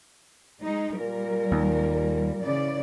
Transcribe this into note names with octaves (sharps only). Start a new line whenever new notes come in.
G#3 D#4
A#2 G3 A#4
D#2
C#3 E3 D5